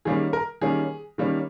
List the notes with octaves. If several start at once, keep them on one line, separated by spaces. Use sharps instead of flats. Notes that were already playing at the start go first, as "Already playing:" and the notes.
D#3 G3 A#3 C#4 G#4
A#4
D#3 G3 A#3 C#4 G#4
D#3 G3 A#3 C#4